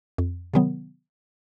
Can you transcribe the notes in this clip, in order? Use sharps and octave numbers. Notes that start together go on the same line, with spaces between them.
F2
C3 D#3 F#3 B3